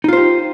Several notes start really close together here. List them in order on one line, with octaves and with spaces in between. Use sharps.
D#4 F4 C5 G4